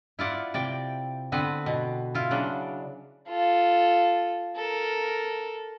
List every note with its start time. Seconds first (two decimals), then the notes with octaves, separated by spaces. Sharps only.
0.19 E4 F4 D5 F#5
0.54 C3 D5 G5
1.32 D3 B3 C4 B4
1.66 B2
2.14 E4 F4
2.31 C#3 F#3 D4
3.29 F4 A4
4.57 A4 A#4